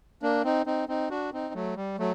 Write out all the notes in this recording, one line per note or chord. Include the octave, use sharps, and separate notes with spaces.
A#3 D4
C4 D#4
C4 D#4
C4 D#4
D4 F#4
C4 D#4
F#3 A3
G3
F#3 A3